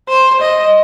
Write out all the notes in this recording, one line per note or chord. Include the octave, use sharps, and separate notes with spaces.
C5
D#5